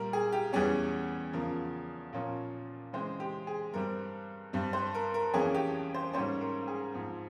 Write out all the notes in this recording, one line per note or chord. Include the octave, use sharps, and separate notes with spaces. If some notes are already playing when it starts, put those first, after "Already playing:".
Already playing: A#2 G3 A#3 A#4
G#4
G4
E2 E3 G3 C#4 G#4
E2 C#3 F3 A#4
A#2 F3 A#3 C#4
C#3 E3 G#3 C4 C5
G4
G#4
G2 G3 C4 A#4
G2 G3 C4
C5
A#4
A#4
F2 E3 A#3 C#4 G#4
G4
C5
G#2 G3 A#3 C#4 C5
A#4
G#4
G#2 F3 C4